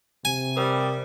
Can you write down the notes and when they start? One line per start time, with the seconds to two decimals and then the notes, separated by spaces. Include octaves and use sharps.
0.25 C3 G#5
0.57 G3 A#4 C5 D#6